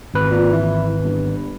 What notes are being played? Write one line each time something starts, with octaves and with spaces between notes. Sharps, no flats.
G#1 B4
A#2
E3
G1